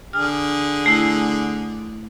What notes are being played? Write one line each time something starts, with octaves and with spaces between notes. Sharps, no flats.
D3 G#4 F6
A3 E4